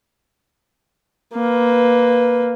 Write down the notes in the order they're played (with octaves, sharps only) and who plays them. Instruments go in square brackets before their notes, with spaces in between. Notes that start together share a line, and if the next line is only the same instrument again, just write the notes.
[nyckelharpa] A#3 B4